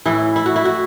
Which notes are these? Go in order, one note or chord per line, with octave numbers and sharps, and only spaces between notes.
A2 E3 E4
E4
F#4
E4
F#4